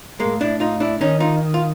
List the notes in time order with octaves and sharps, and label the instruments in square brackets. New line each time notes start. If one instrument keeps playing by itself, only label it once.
[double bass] A2 [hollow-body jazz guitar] G#3 A#3
[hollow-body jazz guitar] D4 E4
D#4 F4
D4 E4
[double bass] D#3 [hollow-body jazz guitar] C#4 D#4
[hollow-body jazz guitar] D#4 F4
F4